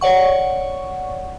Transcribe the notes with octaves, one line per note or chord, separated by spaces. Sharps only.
C#5 D5 F#5 C#6